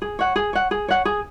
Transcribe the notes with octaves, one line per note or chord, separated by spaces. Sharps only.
G#4
C#5 F#5
G#4
C#5 F#5
G#4
C#5 F#5
G#4